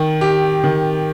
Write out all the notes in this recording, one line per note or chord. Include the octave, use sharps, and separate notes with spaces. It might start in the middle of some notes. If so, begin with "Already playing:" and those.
Already playing: D#3
G4
D#3